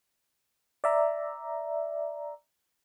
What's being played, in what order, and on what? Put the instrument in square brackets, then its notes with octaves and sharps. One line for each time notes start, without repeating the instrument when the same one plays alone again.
[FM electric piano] D5 E5 A#5